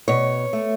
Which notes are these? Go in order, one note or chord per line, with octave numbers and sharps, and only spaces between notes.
B2 C#5
A3